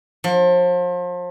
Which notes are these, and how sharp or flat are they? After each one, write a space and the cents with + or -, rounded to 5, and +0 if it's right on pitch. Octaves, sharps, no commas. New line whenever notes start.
F3 +35